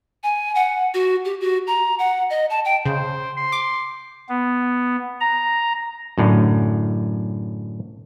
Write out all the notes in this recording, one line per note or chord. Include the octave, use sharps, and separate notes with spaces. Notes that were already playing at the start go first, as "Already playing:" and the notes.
G#5
F#5
F#4
G4
F#4
A#5
F#5
D#5
A5
G5
C#3 C5
C6
D6
B3
A#5
F#2 A2 D3